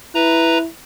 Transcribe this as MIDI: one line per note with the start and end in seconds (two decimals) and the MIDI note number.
0.15 0.66 64
0.15 0.58 71
0.15 0.58 82